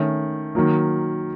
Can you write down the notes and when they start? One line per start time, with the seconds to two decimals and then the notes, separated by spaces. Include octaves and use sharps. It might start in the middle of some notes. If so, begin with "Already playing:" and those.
Already playing: D#3 A3 C#4
0.55 D#3 F#3 A#3